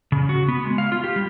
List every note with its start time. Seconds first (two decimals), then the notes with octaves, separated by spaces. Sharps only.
0.12 C#3
0.29 F#4
0.48 B3
0.65 G#3
0.78 F5
0.92 F4
1.04 G4
1.16 G3